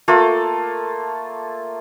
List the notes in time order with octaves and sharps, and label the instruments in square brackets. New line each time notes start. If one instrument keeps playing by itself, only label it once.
[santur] A3 A#3 F4 A4